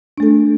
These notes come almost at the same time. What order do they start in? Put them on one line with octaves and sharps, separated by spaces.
D4 A3 A4